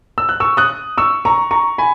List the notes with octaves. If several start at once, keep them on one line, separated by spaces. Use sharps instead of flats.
E6
F#6
C#6 E6
D#6 F#6
C#6 E6
A#5 C#6
A#5 C#6
G#5 B5